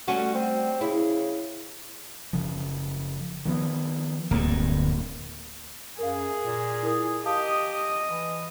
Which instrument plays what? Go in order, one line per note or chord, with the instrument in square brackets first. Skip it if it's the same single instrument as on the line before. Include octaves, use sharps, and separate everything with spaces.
[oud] G3 A3 C#4 [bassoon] F#4
[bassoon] C4
[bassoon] C#3 [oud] E4
[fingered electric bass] F#1 C#3 F3
D#3 F3 B3
[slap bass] D1 G2 [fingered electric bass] D2 F#3 A#3
[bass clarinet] F#2 [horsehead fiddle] G#4 [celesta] A#4 F5
[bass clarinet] A#2
[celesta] E4 A#4 D#6
[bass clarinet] G4 [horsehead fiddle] D#5 [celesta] F5 A5 D#6
[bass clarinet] E3